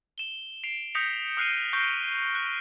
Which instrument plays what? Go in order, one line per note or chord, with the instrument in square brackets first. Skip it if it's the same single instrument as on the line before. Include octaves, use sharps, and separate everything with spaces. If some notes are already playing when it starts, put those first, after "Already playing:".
[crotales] E7 G7
C7 D7 F7
D#6 G6 A#6 B6 C#7 F7
D#6 F6 F#6 C7 D7 D#7
C#6 F6 G6 A#6 C7 D7
F#6